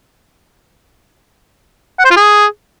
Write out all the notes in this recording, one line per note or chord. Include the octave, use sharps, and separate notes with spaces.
F#5
C5
F4
G#4